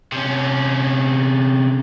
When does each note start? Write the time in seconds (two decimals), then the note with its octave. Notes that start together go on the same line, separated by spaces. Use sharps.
0.12 C3 C#4